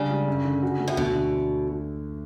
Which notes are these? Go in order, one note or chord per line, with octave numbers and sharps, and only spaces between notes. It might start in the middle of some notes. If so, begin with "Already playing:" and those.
Already playing: C#3 G3 D4
G3
F#2
D3
F#4
A3
A2
D2 B2
D3